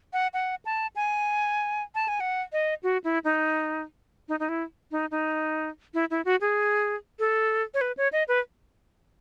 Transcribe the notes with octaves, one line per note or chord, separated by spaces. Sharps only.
F#5
F#5
A5
G#5
A5
G#5
F#5
D#5
F#4
E4
D#4
D#4
D#4
E4
D#4
D#4
E4
E4
F#4
G#4
A4
C#5
B4
C#5
D#5
B4